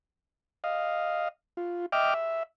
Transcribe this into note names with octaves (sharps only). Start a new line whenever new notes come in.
D#5 F5
F4
D#5 E5 G5 D6 F6
E5